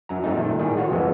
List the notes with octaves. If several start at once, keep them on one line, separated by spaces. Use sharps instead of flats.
F#2 F#3 A#5
F#3 G#3 A3 C4 D#4
A#2 D#3 A3
A2 D#3 G3 G#4
F4 F#4 C#5
C2 F2 E3 G#3 B3